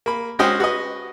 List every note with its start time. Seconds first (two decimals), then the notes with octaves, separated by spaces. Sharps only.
0.06 A#3 B5
0.39 G#3 C#4 F#4 C5 D#5 G5
0.60 F#4 B4 D#5